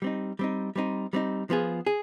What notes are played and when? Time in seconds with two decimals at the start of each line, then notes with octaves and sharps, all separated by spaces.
0.02 G3 C4 D#4
0.39 G3 C4 D#4
0.76 G3 C4 D#4
1.13 G3 C4 D#4
1.50 F3 B3 F4 G#4
1.87 G#4